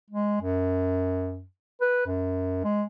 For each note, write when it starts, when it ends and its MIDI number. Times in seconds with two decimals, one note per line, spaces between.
0.11 0.41 56
0.42 1.44 42
1.81 2.05 71
2.07 2.64 42
2.64 2.83 56